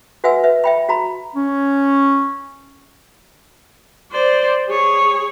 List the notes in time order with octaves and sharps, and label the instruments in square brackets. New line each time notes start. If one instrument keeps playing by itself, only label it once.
[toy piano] F#4 B4 E5 F#5 G#5 E6
B4 E5
E5 G5 B5
F#4 A#5 B5
[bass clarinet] C#4
[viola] C5 D5
G#4 C#5